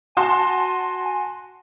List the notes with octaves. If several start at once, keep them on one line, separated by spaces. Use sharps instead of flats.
F#4 G#5 A5 C6